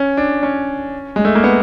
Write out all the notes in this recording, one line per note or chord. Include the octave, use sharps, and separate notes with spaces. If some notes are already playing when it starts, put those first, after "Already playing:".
Already playing: C#4
D4
C#4
G#3
A3
A#3
B3